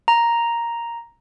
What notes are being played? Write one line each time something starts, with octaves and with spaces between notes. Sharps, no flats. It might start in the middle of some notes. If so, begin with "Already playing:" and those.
A#5